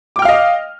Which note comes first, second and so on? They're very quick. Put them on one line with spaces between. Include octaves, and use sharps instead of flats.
D6 G5 F6 F5 D#5